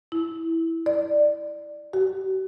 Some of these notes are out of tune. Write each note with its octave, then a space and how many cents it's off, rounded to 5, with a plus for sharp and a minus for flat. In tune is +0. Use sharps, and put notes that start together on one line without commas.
E4 -5
D5 +15
F#4 +45